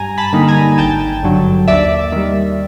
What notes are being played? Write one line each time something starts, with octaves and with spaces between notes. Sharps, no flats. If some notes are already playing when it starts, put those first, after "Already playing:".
Already playing: G2 G#5 A#5
A5 B5
D3 G3 A#3 D#4
G#5 A#5
G#1 G5 A5
G2 D3 F#3
D#2 D5 E5
D#3 G3